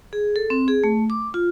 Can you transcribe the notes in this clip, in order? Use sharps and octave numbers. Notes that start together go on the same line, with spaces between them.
G#4
A4
C4
G#4
A3
D6
F4